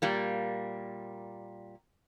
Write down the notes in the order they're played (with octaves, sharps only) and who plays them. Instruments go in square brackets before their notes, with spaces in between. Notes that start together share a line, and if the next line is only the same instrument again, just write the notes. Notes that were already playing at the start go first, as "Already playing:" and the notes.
[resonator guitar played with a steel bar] A#2 G3 A#3